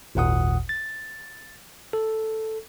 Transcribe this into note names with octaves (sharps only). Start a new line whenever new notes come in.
G#1 D#2 A#2 F#5 D#6
A6
A4